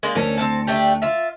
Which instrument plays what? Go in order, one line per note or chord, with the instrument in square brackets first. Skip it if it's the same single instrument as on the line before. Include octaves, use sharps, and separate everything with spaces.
[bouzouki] G#3 A#3 D4
[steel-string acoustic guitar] D2 A4 [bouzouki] C#4 A#4
[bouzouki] C4 C#4 A5
A3 D4 G4
F4 E5